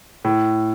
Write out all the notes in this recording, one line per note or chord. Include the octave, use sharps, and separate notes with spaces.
A2